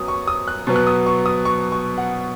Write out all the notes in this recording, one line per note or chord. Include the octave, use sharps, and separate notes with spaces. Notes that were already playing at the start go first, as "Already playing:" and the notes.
Already playing: F#2 F#3 B3 D#6
C#6
D#6
F#6
B2 F#3 B3
F#6
D#6
C#6
D#6
C#6
C#6
F#5